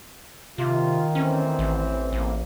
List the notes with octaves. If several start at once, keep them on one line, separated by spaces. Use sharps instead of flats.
C3 D#3 F4
D2 E3 C4 C#4
A1
A1 A#3